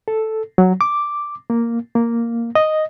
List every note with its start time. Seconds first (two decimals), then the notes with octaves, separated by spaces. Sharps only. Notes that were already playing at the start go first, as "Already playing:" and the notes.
0.08 A4
0.58 F#3
0.81 D6
1.50 A#3
1.95 A#3
2.55 D#5